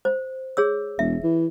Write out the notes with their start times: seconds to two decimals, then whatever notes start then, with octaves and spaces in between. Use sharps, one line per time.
0.05 C5
0.57 G#4 C#5 E6
0.99 E1 E5
1.23 E3